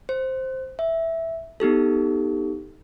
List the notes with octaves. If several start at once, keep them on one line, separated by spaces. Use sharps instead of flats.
C5
E5
B3 D#4 G4 A4